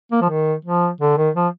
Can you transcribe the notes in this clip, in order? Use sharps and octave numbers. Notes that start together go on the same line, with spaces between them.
A#3
F3
D#3
F3
D3
D#3
F3